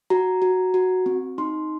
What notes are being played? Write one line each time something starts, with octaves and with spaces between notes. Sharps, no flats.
F#4 A#5
F#4
F#4
C4
D#4 C6